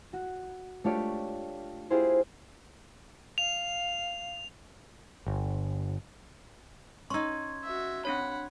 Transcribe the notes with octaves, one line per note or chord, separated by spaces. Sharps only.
F#4
A3 D4 F4 G4 C#5 D5
E4 F4 G4 G#4 C5
F5 F7
G1
C#4 D#4 C6 C#6 E6 G#6
F#4 E5
C4 D4 C#5 F#5 B5